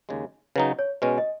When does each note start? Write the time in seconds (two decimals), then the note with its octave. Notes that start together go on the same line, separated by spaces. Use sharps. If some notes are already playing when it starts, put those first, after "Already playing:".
0.09 D#2 C#3 G#3
0.56 C#3 F#3 D#4 B4
0.79 C#5
1.02 B2 G#3 C#4 B4
1.18 D#5